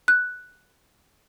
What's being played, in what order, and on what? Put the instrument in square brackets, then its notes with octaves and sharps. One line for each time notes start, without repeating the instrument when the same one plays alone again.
[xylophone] F#6